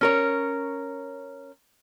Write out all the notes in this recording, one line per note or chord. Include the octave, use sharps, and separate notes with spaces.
C#4 A#4 C#5